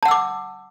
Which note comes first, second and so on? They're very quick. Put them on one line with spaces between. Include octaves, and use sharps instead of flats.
A5 F#5 E6 D6